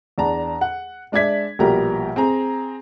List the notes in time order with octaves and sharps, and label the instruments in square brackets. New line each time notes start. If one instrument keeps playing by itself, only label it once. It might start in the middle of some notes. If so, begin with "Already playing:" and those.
[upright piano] E2 D4 A5 A#5
F#5
G#3 D4 D5 E5 G#6 B6
A#1 B2 G3 G4 A#4 A#5
C4 G#4 A#5